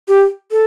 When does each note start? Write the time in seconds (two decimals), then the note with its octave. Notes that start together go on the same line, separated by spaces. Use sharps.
0.08 G4
0.51 A4